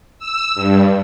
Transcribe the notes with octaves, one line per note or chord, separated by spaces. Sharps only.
E6
G2